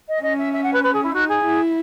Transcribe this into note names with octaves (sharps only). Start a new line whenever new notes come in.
D#5
C#4 D#5
E5
E5
F#5
B4
B4
G#4
E4
D#4 F#4
G#4
E4